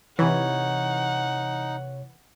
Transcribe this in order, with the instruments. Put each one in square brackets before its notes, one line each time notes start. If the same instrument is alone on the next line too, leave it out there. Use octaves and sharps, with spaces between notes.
[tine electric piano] C3 C#5 [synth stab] E3 [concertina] D#4 [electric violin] F#5